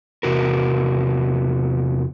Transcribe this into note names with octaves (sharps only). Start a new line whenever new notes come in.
E2 C3 F#4 A#4